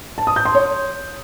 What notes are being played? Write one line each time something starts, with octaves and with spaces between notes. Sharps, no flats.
A5
D#6
G6
C6
C#5